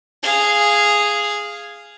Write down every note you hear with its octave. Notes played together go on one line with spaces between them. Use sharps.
G#4 F5